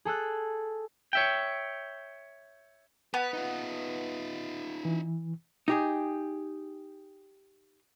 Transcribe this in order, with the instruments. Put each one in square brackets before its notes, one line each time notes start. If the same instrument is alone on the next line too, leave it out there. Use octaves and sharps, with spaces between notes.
[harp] G#4 A4 E6 F#6
[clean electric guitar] C#5 E5 G5
[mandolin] B3 [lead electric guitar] B4
[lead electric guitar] D#4 F4
[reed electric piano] E3
[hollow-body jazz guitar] D#4 G4 G#4